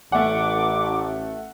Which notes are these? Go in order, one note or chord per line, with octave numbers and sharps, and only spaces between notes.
A1 A3 F#5 D6